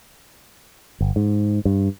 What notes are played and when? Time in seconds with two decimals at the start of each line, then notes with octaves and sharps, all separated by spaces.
1.01 G1
1.16 G#2
1.65 G2